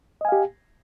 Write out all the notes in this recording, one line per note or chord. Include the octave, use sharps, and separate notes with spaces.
G4 D#5 F5 G#5